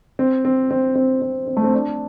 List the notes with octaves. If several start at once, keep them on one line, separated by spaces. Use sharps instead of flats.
C4
C4
C4
C4
C4
C4
A3
C4
D4